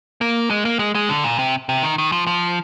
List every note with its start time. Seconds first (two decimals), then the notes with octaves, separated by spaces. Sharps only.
0.21 A#3
0.50 G#3
0.65 A#3
0.79 G#3
0.95 G#3
1.09 D3
1.24 A#2
1.39 C3
1.69 C3
1.83 D#3
1.98 D#3
2.12 F3
2.27 F3